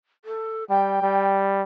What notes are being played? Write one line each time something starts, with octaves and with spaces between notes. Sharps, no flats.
A4
G3 G5
G3